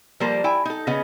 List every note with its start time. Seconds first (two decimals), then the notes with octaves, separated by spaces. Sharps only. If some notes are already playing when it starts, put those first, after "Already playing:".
0.20 F3 G3 A#3 A4 A#4 C5
0.44 E4 G5 G#5
0.65 D#4 A4
0.87 C#3 B3 G#4 D#5